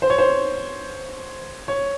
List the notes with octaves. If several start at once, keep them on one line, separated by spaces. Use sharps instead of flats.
C5
C#5
C5
C#5